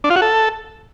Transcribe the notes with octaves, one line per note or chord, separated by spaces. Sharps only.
D4
F4
F#4
A4